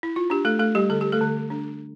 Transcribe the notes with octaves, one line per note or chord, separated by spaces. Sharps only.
E4
F4
D4 G4
A3 A4
A3 A4
G3 G4
D3 A4
G4
A3 A4
D3
D4